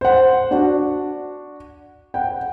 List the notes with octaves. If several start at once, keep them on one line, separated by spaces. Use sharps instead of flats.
C5 F#5
D4 F#4
F#5 G5